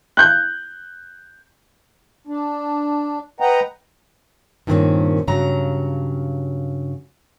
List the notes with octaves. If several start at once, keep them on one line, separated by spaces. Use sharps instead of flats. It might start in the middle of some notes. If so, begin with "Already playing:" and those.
F#6 G6
D4
B4 D#5 F#5 G5 A#5
G2 A#2 D#3 G#3 C4 C#4
G2 C#3 F#3 A#5